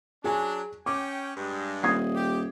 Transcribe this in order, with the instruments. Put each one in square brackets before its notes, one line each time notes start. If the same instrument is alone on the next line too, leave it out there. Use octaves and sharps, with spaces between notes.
[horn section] F#3 D4 [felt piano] G#4 G#5
[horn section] C#4 G5 [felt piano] D6
[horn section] G2 G#3
[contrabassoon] D#1 [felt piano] D#6 G#6 C7
[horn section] G4